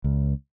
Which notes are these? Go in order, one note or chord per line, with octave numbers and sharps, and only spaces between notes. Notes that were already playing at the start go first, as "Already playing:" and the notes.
C#2